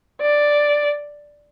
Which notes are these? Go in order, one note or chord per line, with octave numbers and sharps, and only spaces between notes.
D5